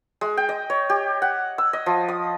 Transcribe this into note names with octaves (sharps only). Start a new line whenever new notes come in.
G#3
G5
D#5
C#5
G4
F#5
E6
D#5
F3
D#6